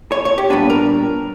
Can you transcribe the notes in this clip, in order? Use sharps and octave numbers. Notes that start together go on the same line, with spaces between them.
C#5
C#5
G4
A#2 G3 B3 D4 B4
A#4